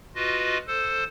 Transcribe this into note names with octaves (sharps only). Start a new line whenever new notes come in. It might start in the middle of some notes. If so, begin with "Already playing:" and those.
F4 F#4 B4 D#5
A4 C5